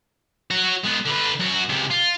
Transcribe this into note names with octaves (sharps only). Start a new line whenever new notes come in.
F#4 C#5
G#3 B3
D3 B4
F#2 F#4
C#2 C3
F4